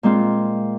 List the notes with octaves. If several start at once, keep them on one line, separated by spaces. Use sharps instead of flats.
A#2 G#3 C4 F4